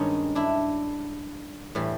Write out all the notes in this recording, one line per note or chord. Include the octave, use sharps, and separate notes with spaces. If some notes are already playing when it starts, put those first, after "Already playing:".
Already playing: G2 D#3 G#3 C#4 D#4
D4 E4
A2 E3 G3